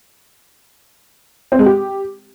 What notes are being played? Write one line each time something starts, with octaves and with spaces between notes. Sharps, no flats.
C4
G#3
G4